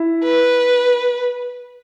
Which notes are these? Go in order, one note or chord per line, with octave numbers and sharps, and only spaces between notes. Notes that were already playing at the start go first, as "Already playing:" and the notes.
Already playing: E4
B4